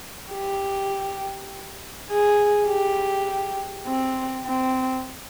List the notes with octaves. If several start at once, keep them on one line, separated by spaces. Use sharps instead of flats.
G4
G#4
G4
C4
C4